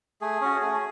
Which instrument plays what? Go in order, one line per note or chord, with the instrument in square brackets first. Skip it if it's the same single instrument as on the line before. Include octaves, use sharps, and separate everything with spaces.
[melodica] A3 G#4
C#4 F#4
A3